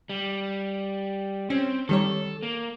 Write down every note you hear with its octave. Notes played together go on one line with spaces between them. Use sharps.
G3
C4 C#4
D#3 G3 A4 C#5
A#3